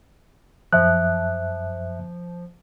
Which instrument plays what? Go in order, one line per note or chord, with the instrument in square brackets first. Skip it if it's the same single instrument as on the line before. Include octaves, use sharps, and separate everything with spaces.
[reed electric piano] F#2 E5 F#6 [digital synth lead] F3